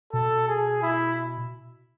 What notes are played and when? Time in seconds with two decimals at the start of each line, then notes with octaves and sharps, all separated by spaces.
0.12 B2 A4
0.47 G#4
0.82 E4